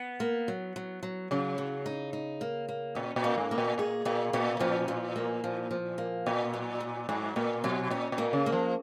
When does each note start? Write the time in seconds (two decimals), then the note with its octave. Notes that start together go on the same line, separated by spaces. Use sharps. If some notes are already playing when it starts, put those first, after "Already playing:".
Already playing: B3
0.20 A#3
0.48 F#3
0.76 F#3
1.03 F#3
1.31 C#3 F#3
1.58 F#3
1.86 D#4
2.13 D#4
2.41 A#3
2.68 A#3
2.95 A#2 C#4
3.16 A#2
3.24 A#3
3.38 G#2
3.51 A#3
3.58 A#2
3.78 A#2 G#4
4.05 A#2 A#3
4.33 A#2 C#4
4.60 A#2 F3
4.88 F3
5.16 A#3
5.44 F3
5.71 F3
5.98 A#3
6.26 A#2 C#4
6.54 F#3
6.81 F#3
7.09 G#2 F#3
7.36 A#2 A#3
7.64 B2 F#3
7.90 A#2 C#4
8.12 A#2
8.18 A#3
8.33 C#3
8.46 A#3
8.52 F3